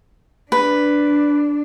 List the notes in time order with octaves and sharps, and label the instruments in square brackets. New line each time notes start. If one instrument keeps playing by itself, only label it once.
[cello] D4 [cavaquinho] B4